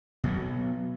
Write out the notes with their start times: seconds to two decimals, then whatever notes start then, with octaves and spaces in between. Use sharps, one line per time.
0.24 B2 F#3 B3